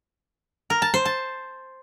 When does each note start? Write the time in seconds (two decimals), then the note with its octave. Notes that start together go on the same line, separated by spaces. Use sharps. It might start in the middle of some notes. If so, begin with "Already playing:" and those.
0.70 A#4
0.82 A5
0.94 C5
1.05 A5